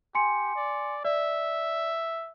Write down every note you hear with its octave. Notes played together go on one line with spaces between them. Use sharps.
G4 G#5 C6 C#7
D5
D5 E5